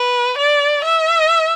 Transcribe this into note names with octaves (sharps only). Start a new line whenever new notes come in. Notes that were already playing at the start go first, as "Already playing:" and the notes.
Already playing: B4
D5
E5